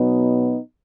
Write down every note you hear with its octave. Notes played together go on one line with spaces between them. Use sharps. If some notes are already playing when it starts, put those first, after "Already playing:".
Already playing: B2 F#3 B3 D#4